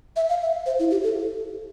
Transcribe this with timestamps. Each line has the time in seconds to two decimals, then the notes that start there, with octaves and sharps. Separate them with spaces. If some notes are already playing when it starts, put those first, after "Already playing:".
0.16 E5
0.29 F5
0.42 E5
0.66 C5
0.79 E4
0.91 G4
1.03 A4